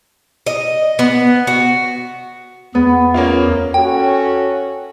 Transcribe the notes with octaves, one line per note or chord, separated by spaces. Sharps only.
D#5
B3
F#4
E2 B3 G#4
A#3 C#4 F4
C#4 F#4 A4 G5